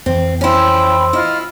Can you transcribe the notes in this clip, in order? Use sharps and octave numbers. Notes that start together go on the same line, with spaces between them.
F2 E3 C4
C#4 E4 C5 G5 B5 C6 E6
E4 F4 D#5 F6